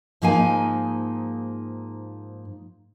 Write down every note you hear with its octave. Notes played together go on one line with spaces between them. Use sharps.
G#2 F3 A#3 D#4 F5 G#5